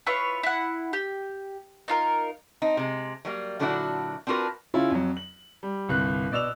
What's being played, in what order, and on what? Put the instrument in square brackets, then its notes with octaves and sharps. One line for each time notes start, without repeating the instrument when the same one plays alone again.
[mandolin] E4 F4 B4 C#5
E4 F#5
G4
D#4 F4 A#4
[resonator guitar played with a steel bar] C4 D#4
C3 G#3
F#3 G3 A#3
A#2 D3 F#3 D4 E4 F#4
C4 D4 F4 F#4 A#4 B4
[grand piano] C#3 C#4 E4 F4
F2 F#3
F#7
G3
G1 C2 F#6
B2 D5 E6 E7 F7